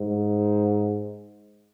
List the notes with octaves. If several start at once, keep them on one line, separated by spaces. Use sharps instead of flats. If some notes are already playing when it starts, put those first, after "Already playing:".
Already playing: G#2